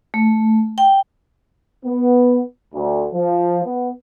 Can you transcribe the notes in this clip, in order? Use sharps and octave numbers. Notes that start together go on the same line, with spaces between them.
A3
G5
B3
D2
F3
B3